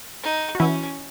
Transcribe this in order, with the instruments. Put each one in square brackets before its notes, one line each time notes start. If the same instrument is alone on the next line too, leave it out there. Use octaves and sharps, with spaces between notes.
[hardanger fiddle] D#4
[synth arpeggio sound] F#4
[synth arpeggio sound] E3 E4 [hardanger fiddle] C#4